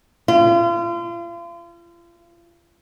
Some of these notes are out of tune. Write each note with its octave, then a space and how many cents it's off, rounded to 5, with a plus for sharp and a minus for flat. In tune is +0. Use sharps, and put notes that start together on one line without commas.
F4 -40